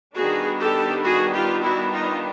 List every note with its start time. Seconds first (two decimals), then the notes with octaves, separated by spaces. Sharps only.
0.15 D#3 G3 B3 D4 F#4 G#4
0.60 G4 A4
1.04 F#4 G#4
1.34 F4 G4
1.63 E4 F#4
1.92 D#4 F4